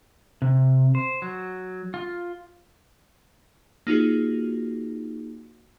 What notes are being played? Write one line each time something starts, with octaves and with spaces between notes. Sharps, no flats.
C3
C5
F#3
F4
A#3 D#4 F4 F#4 G#4